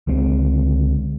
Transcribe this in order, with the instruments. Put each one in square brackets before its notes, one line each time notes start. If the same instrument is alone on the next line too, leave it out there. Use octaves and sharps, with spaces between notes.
[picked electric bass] C#2 D3 G#3 C4